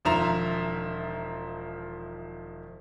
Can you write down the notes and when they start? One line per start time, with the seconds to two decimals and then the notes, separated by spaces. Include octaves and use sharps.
0.05 E1 D#3 F3 E5 A#5 F7